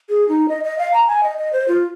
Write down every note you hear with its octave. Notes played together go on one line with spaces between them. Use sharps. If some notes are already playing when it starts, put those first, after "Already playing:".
G#4
D#4
D#5
D#5
F5
A#5
G#5
D#5
D#5
C5
F4